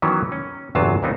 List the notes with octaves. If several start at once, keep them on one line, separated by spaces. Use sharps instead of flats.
D#3 E3 F#3 B3 C#4
C#4
G1 E2 C3 F#3 F4 A5
D#2 G3 B3 C4 D#4